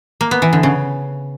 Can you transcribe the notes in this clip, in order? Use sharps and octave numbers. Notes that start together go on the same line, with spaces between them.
A#3
B3
E3
D3
C#3